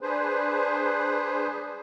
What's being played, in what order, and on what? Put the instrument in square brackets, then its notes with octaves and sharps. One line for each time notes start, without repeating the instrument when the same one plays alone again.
[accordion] D4 G#4 B4 C5